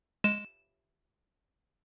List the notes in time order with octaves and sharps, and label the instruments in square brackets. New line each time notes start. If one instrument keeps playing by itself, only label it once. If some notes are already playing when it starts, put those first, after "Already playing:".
[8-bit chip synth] G#3 [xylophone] E7